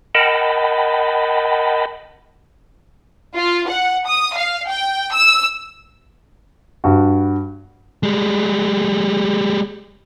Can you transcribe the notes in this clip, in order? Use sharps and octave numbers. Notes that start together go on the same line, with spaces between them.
A#4 D#5 F#5 G5 A5 B5
F4
F#5
D#6
F5
G5
E6
G2 F#4
G3 G#3